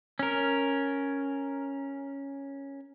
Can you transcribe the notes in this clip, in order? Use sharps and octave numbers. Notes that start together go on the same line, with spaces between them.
C#4 A#4